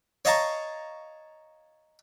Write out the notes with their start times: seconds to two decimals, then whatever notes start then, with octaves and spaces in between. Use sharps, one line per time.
0.25 C#5 D#5 F5 A5 A#5 C#6